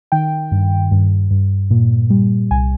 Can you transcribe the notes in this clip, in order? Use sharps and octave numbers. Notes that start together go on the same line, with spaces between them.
D#3 G5
G2
G2
G2
A#2
G3
C2 G#5